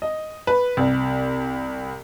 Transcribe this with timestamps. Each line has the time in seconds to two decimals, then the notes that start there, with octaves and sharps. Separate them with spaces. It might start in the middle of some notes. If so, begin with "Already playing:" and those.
0.02 D#5
0.47 B4
0.77 C2